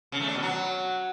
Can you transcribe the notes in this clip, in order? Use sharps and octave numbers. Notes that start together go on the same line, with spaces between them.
C#3
A3
D4
B2
F#3